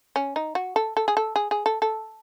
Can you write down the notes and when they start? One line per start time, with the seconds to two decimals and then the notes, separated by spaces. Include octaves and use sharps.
0.16 C#4
0.36 D#4
0.55 F#4
0.76 A4
0.97 A4
1.08 G#4
1.17 A4
1.36 G#4
1.51 G#4
1.66 A4
1.82 A4